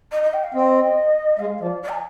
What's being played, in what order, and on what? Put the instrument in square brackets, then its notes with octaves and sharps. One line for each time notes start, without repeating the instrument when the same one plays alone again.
[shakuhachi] D#5
D#5
G5
F5
[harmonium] C4 [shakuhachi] D#5
[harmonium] G#3 [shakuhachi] F5
[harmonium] F3 [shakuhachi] D5
[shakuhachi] D5
A#5
G#5